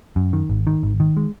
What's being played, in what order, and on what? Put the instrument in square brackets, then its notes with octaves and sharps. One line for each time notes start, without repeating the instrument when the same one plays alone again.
[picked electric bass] F#2
D#3
G#1
D#3
G#1
D#3
G#3